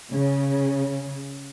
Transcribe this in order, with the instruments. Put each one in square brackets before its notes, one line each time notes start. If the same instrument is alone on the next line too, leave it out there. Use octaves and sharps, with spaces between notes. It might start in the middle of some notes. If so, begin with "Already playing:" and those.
[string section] C#3